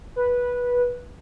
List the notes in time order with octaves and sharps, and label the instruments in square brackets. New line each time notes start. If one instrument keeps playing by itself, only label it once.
[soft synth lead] B4